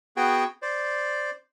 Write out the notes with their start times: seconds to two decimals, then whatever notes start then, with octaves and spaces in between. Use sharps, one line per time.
0.17 B3 F#4 G#4 G5
0.62 C5 D5